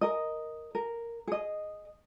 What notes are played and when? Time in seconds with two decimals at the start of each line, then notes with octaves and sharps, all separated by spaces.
0.01 A#4 D#5
0.75 A#4
1.27 G#4 D#5